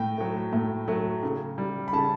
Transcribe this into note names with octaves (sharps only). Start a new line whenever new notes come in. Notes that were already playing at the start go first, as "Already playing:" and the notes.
Already playing: A2 G5
F#3 A3
A2
F#3 A3
C#3
G3
B5
C#3 A5